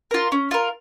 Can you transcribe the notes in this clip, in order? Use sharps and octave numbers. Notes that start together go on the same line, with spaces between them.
F4 A#4
C#4
F4 A#4